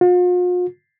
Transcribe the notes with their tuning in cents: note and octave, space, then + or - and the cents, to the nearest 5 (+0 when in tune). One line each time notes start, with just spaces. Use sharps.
F4 +45